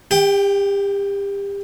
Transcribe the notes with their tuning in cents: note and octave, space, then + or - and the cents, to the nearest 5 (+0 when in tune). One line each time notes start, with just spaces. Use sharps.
G4 +30 G5 -10